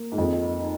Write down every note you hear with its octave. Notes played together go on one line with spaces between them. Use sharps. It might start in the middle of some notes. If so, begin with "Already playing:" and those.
Already playing: A#3
G#2
F2 D#5
D#4